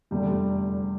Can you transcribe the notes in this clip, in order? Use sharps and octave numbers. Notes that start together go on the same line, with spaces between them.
F1 E2 D3 G3 A3